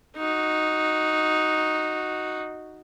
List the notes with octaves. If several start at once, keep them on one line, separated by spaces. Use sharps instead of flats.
D#4 F#4